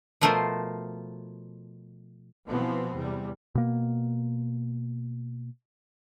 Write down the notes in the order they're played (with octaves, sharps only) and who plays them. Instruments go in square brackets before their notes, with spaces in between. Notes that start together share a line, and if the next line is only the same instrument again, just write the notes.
[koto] B2 F3 A3 F4 A#4 C5
[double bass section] B2 E3 F3 B3 C4
E2 C3 G3
[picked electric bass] B2 A#3